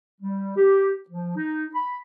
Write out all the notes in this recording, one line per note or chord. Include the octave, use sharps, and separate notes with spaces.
G3
G4
F3
D#4
B5